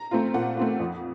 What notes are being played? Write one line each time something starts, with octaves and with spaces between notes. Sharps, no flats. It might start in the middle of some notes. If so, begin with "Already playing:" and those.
Already playing: A#5
A3 C4 F4
A#2 F#5
A3 C4 F4
F2